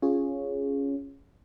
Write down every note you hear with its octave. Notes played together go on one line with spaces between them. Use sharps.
C#4 F4 G#4 C#5